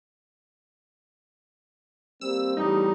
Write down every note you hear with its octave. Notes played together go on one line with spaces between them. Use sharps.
G3 A#3 C4 E6
E2 A2 G3 D#4